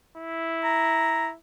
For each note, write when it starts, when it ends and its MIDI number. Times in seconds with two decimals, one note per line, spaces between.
0.17 1.36 64
0.64 1.28 82